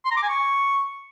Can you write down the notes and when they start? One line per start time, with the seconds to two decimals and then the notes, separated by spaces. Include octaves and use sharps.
0.05 C6
0.11 A#5
0.17 D6
0.23 G#5
0.29 C#6